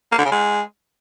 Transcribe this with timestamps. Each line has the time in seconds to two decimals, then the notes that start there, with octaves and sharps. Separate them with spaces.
0.12 A#3
0.18 D3
0.25 C#3
0.32 G#3